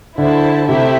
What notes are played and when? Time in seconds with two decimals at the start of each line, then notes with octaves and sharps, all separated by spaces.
0.18 D3 E4 C5 A5
0.68 C3 A3 C4 E4 G4 E5